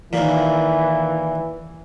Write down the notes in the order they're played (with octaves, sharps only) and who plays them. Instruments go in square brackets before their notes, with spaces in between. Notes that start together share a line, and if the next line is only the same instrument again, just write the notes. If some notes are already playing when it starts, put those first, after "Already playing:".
[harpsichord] D#2 A#2 [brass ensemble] E3